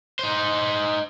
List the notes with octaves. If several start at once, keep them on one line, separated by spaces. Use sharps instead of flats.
D#4 C5